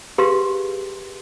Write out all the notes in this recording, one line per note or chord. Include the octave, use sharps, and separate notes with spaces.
G4 G#4 B4 F5 C6